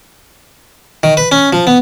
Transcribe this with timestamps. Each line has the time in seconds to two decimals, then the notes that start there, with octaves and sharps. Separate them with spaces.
1.03 D#3
1.17 B4
1.32 C#4
1.53 F3
1.67 B3